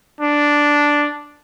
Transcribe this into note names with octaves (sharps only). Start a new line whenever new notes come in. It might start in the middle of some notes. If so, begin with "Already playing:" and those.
D4